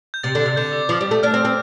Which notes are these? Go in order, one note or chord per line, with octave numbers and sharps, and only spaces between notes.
G6
C3 A6
G6
D3
A6
C3
D3 G6
D6
F3
G3
A3
D4 F6
C4
C4